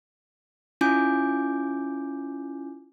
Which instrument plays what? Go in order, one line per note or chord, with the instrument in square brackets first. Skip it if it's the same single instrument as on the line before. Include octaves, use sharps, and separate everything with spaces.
[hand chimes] C#4 E4 F4 G#5 D6 G6